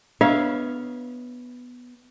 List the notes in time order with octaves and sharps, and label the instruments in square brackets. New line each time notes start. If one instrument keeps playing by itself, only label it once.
[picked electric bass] B3 [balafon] D4 [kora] C#5 E5 F5